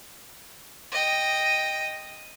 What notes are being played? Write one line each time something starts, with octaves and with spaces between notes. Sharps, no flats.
D#5 G5